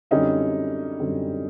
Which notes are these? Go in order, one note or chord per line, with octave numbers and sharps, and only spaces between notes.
F#2 D3 G3 C4 C#4 D#4
F#2 D3 G3 C4